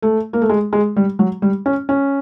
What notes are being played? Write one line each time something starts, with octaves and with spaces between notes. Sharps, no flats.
A3
A#3
A3
G#3
G#3
G3
F#3
G3
C#4
C#4